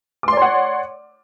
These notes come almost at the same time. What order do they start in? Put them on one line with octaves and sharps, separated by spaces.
D6 C6 D5 C#5 F#5